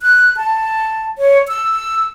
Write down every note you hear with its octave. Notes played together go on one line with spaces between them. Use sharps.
F#6
A5
C#5
E6